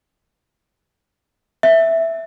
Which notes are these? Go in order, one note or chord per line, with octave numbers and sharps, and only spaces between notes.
E5